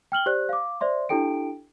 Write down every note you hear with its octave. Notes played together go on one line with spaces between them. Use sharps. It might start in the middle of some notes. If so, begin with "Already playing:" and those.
G5 F6 F#7 G7
G4 C5 D5 F#6
F5 D6
C5 D5 E5 C6
D4 E4 G4 A4 G5 D7